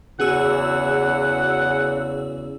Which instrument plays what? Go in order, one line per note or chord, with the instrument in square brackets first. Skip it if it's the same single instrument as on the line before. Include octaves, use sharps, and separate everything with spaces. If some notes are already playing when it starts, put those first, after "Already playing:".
[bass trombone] E2 [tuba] C#3 [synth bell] F#4 G#4 E6 [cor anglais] F#5